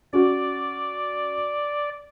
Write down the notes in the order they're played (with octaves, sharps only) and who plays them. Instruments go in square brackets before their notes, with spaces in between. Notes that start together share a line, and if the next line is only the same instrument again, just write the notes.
[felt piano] C#4 F#4 [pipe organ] D5